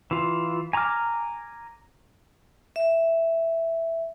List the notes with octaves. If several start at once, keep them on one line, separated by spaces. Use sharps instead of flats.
E3 F4
G#5 A#5 C#6 D6 F6
E5